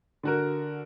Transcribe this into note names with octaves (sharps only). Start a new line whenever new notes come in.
D3 F#4 A#4